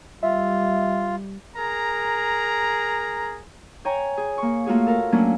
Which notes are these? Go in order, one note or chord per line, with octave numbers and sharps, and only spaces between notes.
G3 F4 E5
G#4 A#4 A#5
C#5 G5 G#5 A#5
G#4
A#3 C#6
A3 A#3 F4 F#4 G#4
A4 A#4
F#3 A3 A#3 C#4 D4